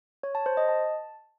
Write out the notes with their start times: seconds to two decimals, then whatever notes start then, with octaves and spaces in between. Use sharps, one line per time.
0.23 C#5
0.35 A5
0.46 C5
0.57 D#5
0.69 A5